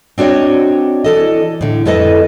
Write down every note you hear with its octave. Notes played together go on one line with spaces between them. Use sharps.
C4 D4 F#4 C#5 D#5
E3 A4 D#5
A2 D3
F2 A3 E4 A4 B4 D#5